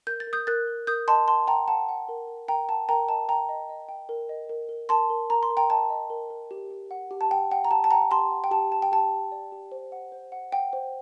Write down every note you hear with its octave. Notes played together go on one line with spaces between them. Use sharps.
A#4 G6
A6
A#4
D#6 G6
A#4 F#6 A6
A#4
A#4 D#6 G6
D#5 A5 C6
F#5 A5 C6
F#5 G5 A#5
F#5 A5
F#5
A#4
A#4
A#4 G5 A#5
F#5 A5
A#4 G5 A#5
D#5 A5
G5 A#5
D#5
D#5
G5
A#4
D#5
A#4
A#4
A#4 A5 C6
A#4
A#4 A#5
C6
A#4
G5 A#5
D#5 A5
D#5
A#4
A#4
G4
G4
F#5
G4
A5
F#5 G5
F#5 G5
A#5
G4 A5
A5
F#5 G5 A#5
G4 A5 C6
F#5
G5
G4 A5
G4 A5
G5
G4 A5
G4
D5
G4
C5
F#5
C5
F#5
F#5 G5
C5